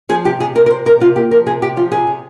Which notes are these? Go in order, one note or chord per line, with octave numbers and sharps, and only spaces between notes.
F3 G#4
C3 G4
C3 G#4
C3 A#4
A#4
C3 C5
C3 A#4
C3 F4
A#3 G4
F3 A#4
C3 G#4
C3 G4
F3 F4
C3 G#4
C3